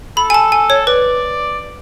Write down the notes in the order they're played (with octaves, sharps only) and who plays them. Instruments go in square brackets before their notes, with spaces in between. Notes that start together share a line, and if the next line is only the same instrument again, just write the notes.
[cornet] A4 [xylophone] B5
[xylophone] G#5
A5
G#5
C#5
[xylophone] B4 [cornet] D5